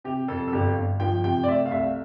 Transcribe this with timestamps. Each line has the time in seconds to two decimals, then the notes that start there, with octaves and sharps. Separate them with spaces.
0.04 C3 G4
0.28 F2 A4
0.48 A4
0.53 G1 G4
0.76 G1
1.00 F3 G5
1.24 C3 G5
1.43 D5
1.48 A3 E5
1.66 F5
1.71 C2 E5